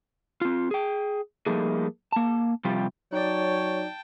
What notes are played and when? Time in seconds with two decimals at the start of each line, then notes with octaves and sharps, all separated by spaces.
0.41 C4 F4
0.71 G#4 G5
1.46 F3 G3 A3 A#3 D#4 G#4
2.12 A#3 A5
2.65 C3 F3 G3 F4 G4
3.13 F#3 D#4 C#5 D5 G5 A5